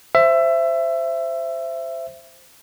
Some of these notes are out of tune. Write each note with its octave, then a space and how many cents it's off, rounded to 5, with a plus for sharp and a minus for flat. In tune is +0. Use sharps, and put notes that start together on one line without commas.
C5 +0 E5 +20